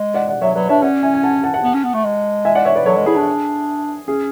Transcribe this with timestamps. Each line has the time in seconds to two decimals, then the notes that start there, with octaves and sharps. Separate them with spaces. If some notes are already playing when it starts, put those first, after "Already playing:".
Already playing: G#3
0.14 D5 F#5
0.28 D5 F#5
0.41 F#3 C#5 E5
0.55 F#3 B4 D5
0.69 D4 C#5 E5
0.82 C#4 D5 F#5
1.03 E5 G#5
1.14 G#5
1.23 F#5 A5
1.44 F#5 A5
1.54 F#5 A5
1.63 B3
1.74 C#4
1.84 B3
1.94 A3
2.04 G#3
2.45 E5 G#5
2.55 D5 F#5
2.65 C#5 E5
2.76 B4 D5
2.85 F#3 A4 C#5
2.96 G#3
3.06 E4 G#4
3.16 D4
4.07 C#4 G#4